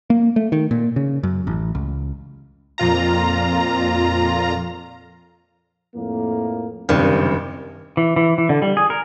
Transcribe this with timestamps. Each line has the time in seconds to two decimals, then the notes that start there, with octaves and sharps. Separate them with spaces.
0.10 A#3
0.36 A3
0.52 D#3
0.71 A#2
0.96 C#3
1.23 F#2
1.47 A1
1.75 C#2
2.78 F2 A#2 F4 A#5
5.94 F2 A2 A#3
6.89 F#1 G2 C3 D#3
7.97 E3
8.16 E3
8.38 E3
8.49 D3
8.62 G3
8.77 G#4
8.90 A#4